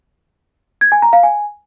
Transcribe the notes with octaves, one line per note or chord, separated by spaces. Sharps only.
G#6
G#5
A#5
F5
G#5